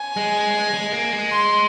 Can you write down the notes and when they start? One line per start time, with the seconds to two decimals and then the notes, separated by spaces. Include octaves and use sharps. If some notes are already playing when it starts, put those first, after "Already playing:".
Already playing: G#5
0.17 G#3
0.74 G#3
0.93 A#3
1.13 G#3
1.31 C6